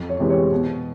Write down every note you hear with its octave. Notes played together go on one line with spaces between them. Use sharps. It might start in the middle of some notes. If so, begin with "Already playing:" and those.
Already playing: F2
C#5
C3 E3 G#3
C#5
B2